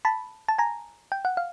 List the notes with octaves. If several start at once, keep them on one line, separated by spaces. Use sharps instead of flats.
A5 B5
A5
G#5 A#5
G5
F#5
F5